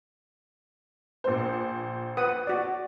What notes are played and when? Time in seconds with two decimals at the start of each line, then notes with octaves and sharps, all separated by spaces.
1.24 A#1 C5
2.17 B4 F#5 D#6
2.47 F#4 D5